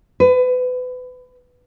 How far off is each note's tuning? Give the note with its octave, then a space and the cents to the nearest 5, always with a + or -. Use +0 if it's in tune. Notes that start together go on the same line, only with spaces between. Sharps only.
B4 +30